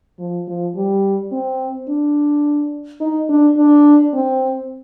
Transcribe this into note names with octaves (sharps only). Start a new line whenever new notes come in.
F3
F3
G3
C4
D4
D#4
D4
D4
C4